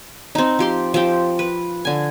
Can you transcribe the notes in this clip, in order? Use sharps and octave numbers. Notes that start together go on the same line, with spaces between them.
C4 D#4
F3 G4 C6
F3 C4 G4 G5
B4
D3 G#5